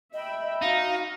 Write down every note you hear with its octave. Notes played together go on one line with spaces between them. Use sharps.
D#5 E5 G5 B5
D#4 F#4 F5